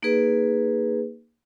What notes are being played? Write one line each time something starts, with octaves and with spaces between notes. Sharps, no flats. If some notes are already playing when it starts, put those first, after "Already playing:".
A#3 D#4 G#4 B4